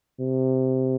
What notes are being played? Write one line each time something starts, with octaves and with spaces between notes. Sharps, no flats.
C3